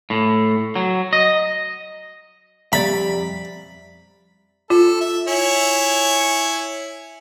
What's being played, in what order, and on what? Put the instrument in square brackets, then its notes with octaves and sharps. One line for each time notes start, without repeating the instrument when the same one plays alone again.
[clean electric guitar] A2
F#3
D#5
[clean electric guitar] F2 A#5 [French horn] G3 [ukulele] D5 E5 [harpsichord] B5
[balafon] F4 [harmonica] A4
[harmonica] E5
E4 C#5 G#5